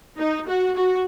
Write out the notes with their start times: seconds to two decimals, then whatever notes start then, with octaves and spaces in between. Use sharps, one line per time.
0.18 D#4
0.47 F#4
0.76 F#4